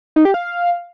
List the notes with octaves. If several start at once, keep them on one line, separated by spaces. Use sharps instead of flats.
D#4
G4
F5